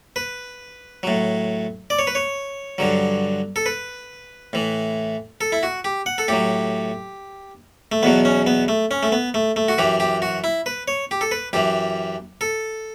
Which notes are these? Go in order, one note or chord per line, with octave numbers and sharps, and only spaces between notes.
B4
A2 F#3
D5
C#5
B4
C#5
G2 D3 F#3
A4
B4
A2 E3
A4
E4
F#4
G4
F#5
A4
A2 F#3 G4
A3
E2 B2 F#3 B3
C#4
B3
A3
C#4
A3
B3
A3
A3
F#4
F#2 E3 G4
G4
F#4
E4
B4
C#5
G4
A4
B4
F#2 E3 G4
A4